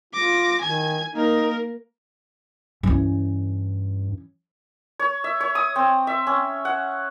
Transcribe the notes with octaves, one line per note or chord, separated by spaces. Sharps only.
F4 D6 A#6
D#3 G#5 G#6
A#3 D#4 A#4
G2 E3 C#4
C#5
E5
C#5
D#6
C4
E5
C#4
F#5